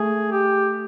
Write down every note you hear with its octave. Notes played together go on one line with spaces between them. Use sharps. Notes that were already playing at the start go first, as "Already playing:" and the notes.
Already playing: A3 G#4
G4